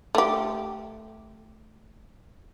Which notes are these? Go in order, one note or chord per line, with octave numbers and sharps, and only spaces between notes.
A3 G4